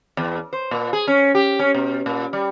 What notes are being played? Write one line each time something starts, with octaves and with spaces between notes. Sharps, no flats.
E2
C5
A#2
G#4
C#4
G4
C#4
B2
A#2
G3